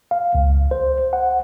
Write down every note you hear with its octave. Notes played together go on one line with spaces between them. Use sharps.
F5
C#2
C5
F#5